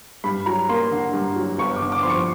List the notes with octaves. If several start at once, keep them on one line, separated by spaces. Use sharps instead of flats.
G2 B5
F#3 A#5
A#3 C6
D3
G2
F#3
G1 C#6
D6
D3
D6
F3 C6
C#6